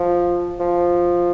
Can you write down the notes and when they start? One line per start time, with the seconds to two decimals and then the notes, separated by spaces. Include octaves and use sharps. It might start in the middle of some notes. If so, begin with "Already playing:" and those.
Already playing: F3
0.60 F3